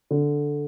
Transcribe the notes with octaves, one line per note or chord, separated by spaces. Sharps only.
D3